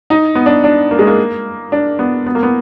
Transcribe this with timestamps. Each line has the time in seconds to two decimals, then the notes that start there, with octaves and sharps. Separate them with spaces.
0.10 D#4
0.35 B3
0.46 D4
0.64 D4
0.91 A#3
0.99 G#3
1.07 A#3
1.72 D4
1.99 B3
2.26 B3
2.35 A#3
2.43 B3